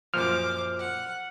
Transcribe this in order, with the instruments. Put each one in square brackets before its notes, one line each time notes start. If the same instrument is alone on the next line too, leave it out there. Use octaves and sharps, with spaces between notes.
[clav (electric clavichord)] F#2 A#2 F3 [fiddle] C5 D6 [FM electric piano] F6
[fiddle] F#5